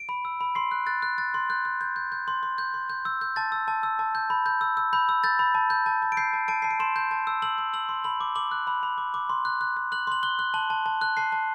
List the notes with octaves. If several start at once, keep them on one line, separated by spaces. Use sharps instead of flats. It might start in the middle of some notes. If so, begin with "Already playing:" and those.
Already playing: D7
B5
E6
B5
C6 C7
F#6
F#6 A6
F#6
F#6 A6
C6
F#6 G6
F#6
G6
G6
G6
C6
C6
G6
C6
G6
E6 G6
G6
A5 A6
E6
A5
E6
A5
G6
B5
G6
E6
E6
B5 G6
E6
G6 A6
B5
A5
G6
A5
A5
D7
G6 C7
A5
A5 D7
A5 C7
D7
C6 E7
G6
A5
E6
E6 F#7
E6
E6 F#7
C6
B5 F#7
D6
D6 F#7
F#6
B5
B5
D6
D6
C6
F#6
F#6
F#6
F#6 F#7
C6 F#7
F#6 G7
F#6
A5 F#7
A5
A5
F#6
A5 C7
A5